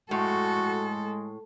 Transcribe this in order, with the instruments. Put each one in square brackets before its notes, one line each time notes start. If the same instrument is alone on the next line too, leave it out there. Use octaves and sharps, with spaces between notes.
[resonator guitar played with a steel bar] A2 [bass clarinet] G#3 [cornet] F#4 [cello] A4